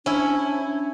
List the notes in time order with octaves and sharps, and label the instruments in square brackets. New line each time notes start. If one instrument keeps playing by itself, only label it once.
[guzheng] C#4 E4 [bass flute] D4